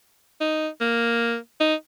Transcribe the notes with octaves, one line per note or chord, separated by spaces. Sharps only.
D#4
A#3
D#4